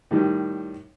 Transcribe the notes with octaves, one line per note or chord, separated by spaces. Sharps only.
A2 D#3 G3